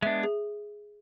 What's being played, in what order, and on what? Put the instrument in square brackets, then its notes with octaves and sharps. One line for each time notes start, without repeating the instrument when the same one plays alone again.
[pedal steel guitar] G#3 B3 D4 [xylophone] E5
[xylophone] G#4